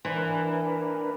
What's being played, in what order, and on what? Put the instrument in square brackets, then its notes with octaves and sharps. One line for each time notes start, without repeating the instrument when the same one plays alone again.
[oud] E3 [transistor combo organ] D4 A#4 B4